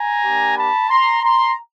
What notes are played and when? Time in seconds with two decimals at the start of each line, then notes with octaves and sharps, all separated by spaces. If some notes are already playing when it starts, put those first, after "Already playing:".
Already playing: G#5 A#5
0.24 A#3 D4 G4
0.56 A5 B5
0.89 A#5 C6
1.22 A#5 C6